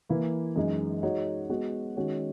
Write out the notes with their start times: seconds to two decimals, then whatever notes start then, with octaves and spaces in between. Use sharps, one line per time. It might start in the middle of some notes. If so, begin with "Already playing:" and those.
0.09 E3 A#3 E4 B4
0.56 F#2 E3 G#3 D#4
1.03 G#3 D#4 F#4 C#5
1.49 G#3 B3 F#4
1.97 D#3 G#3 C#4 F#4 C#5